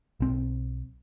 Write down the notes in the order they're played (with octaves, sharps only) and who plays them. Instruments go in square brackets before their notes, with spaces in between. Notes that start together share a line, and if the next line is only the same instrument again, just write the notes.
[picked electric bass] B1 C4